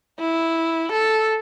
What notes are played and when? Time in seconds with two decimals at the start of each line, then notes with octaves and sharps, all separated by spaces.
0.20 E4
0.92 A4